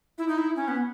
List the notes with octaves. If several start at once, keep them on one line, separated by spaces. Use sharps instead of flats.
E4
D#4
E4
C#4
B3